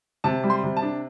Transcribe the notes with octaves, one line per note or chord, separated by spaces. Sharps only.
C3 A5
G3
C6
C3
A5
D4